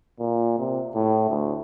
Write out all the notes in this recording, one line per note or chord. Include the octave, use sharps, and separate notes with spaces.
A#2
C3
A2
D2